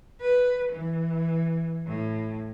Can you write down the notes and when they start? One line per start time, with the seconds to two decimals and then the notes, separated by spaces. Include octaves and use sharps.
0.21 B4
0.72 E3
1.87 A2